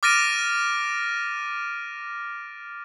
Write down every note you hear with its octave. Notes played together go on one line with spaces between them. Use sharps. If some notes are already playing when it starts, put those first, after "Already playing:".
D6 F6 A6 A#6 D7 D#7